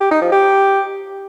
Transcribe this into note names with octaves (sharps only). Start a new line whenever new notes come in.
G4
D#4
F3
G4